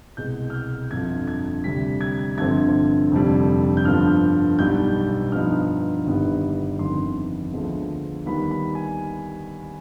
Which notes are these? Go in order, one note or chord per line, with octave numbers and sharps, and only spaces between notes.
C2 B2 G#3 G6
F6
G6
G1 F2 D3 F3 G#6
G#6
D2 C3 G3 B6
G#6
G1 G2 D3 F3 C4 G#6
F1 F2 D3 G3
G6
G2 D3 F3 B3 F6
B1 B2 G3 B3 G6
G2 F3 B3 D#4 F6
G1 G2 D#3 G3 B3
G1 F2 D#3 B3 C6
D2 D3 F3 G#3 B3
D#2 D#3 G3 B3 D#4 B5
B5
G#5